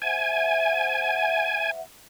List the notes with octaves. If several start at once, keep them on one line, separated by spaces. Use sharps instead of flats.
C5 E5 F#5 G#5